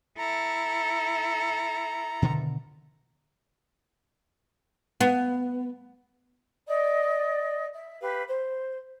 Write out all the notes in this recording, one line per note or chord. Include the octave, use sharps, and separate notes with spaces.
E4 A4 A#5
B2 D3 D#3
B3
D5 D#5
E5
G4 B4 F5
C5